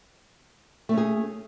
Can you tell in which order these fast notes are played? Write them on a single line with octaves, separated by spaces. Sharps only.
A3 C#4 G#4